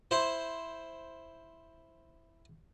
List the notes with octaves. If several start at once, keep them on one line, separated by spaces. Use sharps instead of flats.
E4 C5